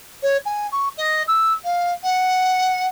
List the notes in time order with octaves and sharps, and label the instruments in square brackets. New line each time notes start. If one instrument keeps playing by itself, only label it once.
[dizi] C#5
G#5
C#6
D#5
E6
F5
F#5